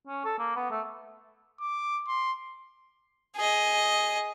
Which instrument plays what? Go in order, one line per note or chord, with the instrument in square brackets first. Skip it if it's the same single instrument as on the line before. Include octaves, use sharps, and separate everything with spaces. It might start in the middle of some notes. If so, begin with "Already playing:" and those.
[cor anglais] C#4
A4
A#3
B3
A3
[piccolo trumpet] D6
C6
[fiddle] G#4 D#5